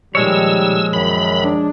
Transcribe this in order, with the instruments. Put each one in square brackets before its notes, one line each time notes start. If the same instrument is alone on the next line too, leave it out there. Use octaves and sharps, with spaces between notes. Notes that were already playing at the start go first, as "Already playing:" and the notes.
[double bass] A#2 [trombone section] D#3 G3 [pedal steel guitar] F3 G#3 C#5 [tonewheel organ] E6
[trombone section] F#2 D#3 [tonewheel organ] B5
[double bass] D4